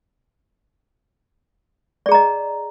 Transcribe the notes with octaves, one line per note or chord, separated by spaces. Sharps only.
G#4 D5 D#5 A#5